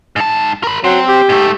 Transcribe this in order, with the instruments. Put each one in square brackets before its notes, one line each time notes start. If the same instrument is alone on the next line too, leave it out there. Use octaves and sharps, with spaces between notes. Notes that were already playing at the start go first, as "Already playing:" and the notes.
[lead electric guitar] G#2 A5
A#4 B5
[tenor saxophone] F#3 [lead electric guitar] C4
[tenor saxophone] G4
[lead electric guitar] G#2 A3